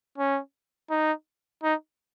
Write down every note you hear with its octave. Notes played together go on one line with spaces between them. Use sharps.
C#4
D#4
D#4